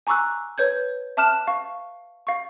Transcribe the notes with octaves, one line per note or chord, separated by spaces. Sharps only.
G#5 A#5 C#6 D6 E6 F#6
B4 C#5 G6 G#6
E5 A5 D6 F6 F#6 E7
F5 C#6
F5 C#6